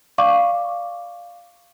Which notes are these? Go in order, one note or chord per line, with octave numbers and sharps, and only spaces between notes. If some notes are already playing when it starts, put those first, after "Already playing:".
D5 F5 C#6 D6